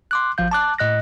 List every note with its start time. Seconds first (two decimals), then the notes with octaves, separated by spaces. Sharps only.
0.11 C6 D6 F#6
0.38 G#1 F3 F5 G6
0.51 A5 D6 F#6
0.78 A2 D#5 F#6 A#6